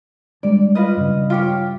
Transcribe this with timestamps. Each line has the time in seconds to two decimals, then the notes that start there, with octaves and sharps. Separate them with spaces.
0.43 G3 G#3 D4 D5
0.75 F4 B4 D#5
0.97 G2 C#3
1.30 F4 G4 C#5